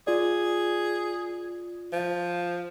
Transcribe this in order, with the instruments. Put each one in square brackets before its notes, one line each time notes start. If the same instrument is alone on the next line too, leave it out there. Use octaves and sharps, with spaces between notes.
[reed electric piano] F4 D5 [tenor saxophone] G#4
[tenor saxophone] F3